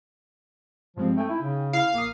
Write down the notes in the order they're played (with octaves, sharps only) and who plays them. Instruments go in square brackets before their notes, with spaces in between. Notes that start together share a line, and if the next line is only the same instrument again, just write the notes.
[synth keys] G2 G#3 C4 [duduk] F3
[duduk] A3 [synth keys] D#4 G5 G#5
[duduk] E4
C#3
[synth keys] E4 F6 [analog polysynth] F5
[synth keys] A#1 D#6 [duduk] A#3